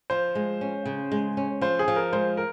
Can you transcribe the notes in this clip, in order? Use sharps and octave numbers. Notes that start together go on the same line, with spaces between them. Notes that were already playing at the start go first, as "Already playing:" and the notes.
F3 C5
G#3
C#4
C#3
G#3
C#4
F3 C5
G#4
F3
A#4
G#3 C5
A#4